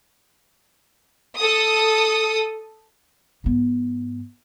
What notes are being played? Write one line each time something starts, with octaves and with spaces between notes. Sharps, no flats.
A4 D#6
G#2 B3